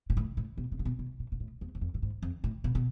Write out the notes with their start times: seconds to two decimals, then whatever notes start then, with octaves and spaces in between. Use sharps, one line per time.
0.10 A#2
0.17 A2
0.37 A2
0.58 B2
0.72 C3
0.79 A#2
0.85 B2
0.99 B2
1.20 A#2
1.32 A#2
1.40 A2
1.61 E2
1.75 F#2
1.81 F2
1.94 A2
2.02 G#2
2.22 F2
2.44 A2
2.64 B2
2.75 B2